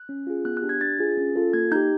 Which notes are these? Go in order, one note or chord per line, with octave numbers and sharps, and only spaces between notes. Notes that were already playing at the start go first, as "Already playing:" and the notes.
Already playing: F#6
C#4
F4 G#4
B3 F#6
F#6
D4 G4
G#6
D4 A6
F4 G#4
C#4
F4 A4
A#3 G#6
D#4 G4 G6